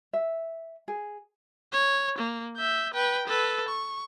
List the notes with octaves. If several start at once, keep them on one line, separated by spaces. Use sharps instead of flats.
E5
G#4
C#5
A#3
E5 G6
B4 G5
A4 B4
C#6